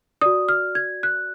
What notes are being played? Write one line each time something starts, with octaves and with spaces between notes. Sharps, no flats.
F#4 D5 D#6
F6
G#6
F#6